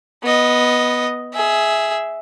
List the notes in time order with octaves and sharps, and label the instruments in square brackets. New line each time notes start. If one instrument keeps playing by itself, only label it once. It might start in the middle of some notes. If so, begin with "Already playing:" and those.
[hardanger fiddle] B3 D#5
G#4 E5